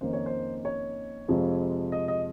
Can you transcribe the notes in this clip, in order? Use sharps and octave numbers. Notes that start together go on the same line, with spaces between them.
F2 D#3 A#3 C#4 C5
C#5
C5
C#5
F2 C3 F3 G#3
D#5
D#5